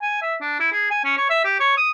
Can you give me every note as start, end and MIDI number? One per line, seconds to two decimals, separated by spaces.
0.02 0.19 80
0.22 0.35 76
0.41 0.56 62
0.60 0.68 64
0.72 0.86 68
0.91 0.99 80
1.04 1.15 61
1.18 1.30 73
1.30 1.42 76
1.45 1.55 67
1.60 1.75 73
1.78 1.91 87